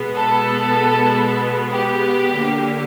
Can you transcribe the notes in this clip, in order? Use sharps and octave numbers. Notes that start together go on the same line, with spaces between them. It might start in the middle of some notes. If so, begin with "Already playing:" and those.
Already playing: B2 G#3 B3
A4
G4
D3 F#3 A#3